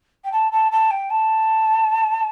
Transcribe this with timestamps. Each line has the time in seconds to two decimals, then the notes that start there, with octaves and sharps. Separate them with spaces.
0.24 G5
0.32 A5
0.52 A5
0.72 A5
0.91 G5
1.10 A5